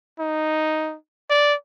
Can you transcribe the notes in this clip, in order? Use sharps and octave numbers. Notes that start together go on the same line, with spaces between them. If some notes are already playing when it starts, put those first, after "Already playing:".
D#4
D5